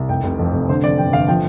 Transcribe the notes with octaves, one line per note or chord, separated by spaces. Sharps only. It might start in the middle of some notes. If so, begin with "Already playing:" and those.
Already playing: C2
F1 G5
F1
F2
F1
D3 C5
F2 D5
G1 G5
G1 F5
F3 G5